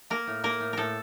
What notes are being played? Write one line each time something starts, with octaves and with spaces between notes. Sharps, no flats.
A#3 A#4
A2
A#3 A#4
A2
A2 A4 A#4